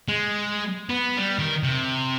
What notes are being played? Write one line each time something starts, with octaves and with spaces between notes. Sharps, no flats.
G#3
B3
G3
D#3
C3